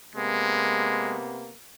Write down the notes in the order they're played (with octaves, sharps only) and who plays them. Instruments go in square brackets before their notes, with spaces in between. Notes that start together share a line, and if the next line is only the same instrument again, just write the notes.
[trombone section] C3 A#3 B3 [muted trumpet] G#3